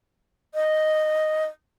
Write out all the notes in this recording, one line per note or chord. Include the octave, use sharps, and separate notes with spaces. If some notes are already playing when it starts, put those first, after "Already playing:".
D#5